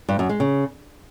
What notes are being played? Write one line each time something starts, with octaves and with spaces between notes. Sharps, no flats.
G2
F#2
G#3
C#3